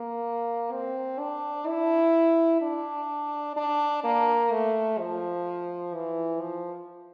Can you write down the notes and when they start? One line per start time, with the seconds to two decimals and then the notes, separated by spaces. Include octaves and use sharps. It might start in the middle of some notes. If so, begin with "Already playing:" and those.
Already playing: A#3
0.72 C4
1.19 D4
1.67 E4
2.62 D4
3.57 D4
4.04 A#3
4.51 A3
4.99 F3
5.94 E3
6.41 F3